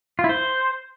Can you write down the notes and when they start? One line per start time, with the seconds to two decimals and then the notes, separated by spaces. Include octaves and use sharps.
0.19 F4
0.24 E4
0.29 C5